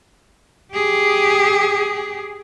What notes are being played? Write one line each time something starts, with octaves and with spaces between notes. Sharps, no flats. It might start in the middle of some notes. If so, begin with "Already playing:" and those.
G4 G#4